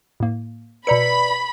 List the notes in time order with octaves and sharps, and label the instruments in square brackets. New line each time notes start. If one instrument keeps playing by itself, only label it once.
[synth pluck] A2 A#3
[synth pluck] B2 A#5 C#7 [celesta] B4 D5 [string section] B5